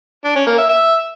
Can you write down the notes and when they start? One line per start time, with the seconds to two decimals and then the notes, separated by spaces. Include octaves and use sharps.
0.24 D4
0.36 C#4
0.47 A#3
0.58 E5
0.69 E5